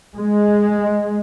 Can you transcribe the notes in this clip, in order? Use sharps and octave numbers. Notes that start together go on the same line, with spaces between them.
G#3